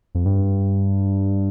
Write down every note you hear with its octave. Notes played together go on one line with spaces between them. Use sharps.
F2
G2